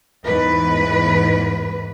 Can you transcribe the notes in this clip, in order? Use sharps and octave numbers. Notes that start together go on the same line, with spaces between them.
E2 G#2 B4